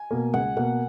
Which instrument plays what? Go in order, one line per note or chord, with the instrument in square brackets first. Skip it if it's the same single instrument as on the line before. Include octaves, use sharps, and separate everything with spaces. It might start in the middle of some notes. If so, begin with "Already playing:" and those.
Already playing: [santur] G#5
[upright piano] B2 A#3
[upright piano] C#2 [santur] F#5
[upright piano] B2 A#3 [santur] F#5